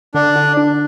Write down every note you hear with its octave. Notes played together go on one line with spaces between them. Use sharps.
D3 D4
D3
D4